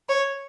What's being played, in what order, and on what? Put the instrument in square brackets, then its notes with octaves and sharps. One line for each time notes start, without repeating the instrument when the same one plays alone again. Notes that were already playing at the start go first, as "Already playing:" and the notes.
[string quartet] C#5